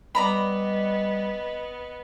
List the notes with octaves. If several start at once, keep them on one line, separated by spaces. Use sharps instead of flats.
G3 B3 D5 D#5 A#5 B5